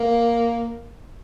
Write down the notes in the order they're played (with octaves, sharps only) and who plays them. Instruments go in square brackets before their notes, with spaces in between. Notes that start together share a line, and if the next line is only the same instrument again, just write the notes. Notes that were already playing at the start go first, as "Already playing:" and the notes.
Already playing: [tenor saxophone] A#3